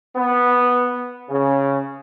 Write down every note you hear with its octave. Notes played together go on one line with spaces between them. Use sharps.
B3
C#3